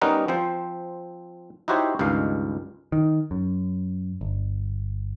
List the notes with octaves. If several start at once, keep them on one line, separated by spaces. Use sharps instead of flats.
G3 B3 C#4 D#4 A#4 F#5
F3 C4 C5
D#4 E4 F#4 G4 C5 C#5
C#2 G2 D#3 G#3 F5
D#3
F#2
G1